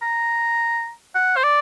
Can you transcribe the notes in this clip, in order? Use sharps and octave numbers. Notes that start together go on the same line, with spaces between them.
A#5
F#5
C5
D5